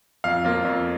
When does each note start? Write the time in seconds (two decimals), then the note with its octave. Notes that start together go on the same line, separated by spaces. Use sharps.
0.24 F2 F5
0.44 F3 A#3 F4
0.64 F2